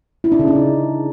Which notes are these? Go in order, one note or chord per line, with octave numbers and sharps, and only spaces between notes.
E4
D4
C#3
D#4
E4